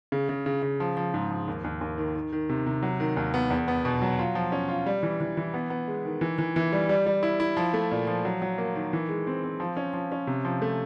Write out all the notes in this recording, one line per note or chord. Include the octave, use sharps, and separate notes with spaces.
C#3
C#3
C#3
C#3
F3
F3
G#2
F3
D#2
D#2
D#2
D#3
D#3
D#3
C3
C3
F#3
D#3
D#2
B3
E2
B3
B2
F#3
F4
F3
C#4
F4
G3
E3
E3
E3
B3
B3
G#3
D#3
E3
E3
E3
G3
G3
G3
E4
E4
F3
A3
A#2
F3
F#3
F#3
A#3
D#3
E3
G#3
C4
C4
F3
C#4
F3
C#4
C3
F3
A3